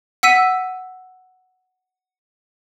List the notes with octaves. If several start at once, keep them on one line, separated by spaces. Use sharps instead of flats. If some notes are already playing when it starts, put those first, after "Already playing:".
F#5 E6 B6 D#7